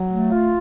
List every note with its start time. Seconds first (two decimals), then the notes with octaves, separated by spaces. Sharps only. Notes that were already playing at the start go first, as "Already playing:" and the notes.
Already playing: F#3
0.09 A3
0.31 F4